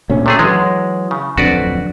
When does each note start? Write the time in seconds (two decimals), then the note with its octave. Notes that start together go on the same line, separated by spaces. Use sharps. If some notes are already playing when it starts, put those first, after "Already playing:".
0.10 D2 A#2 C#4
0.26 C3 A3 G#4
0.39 E3 F#3 G#3
1.11 C#3
1.38 D1 F2 D3 F#4 B4 D5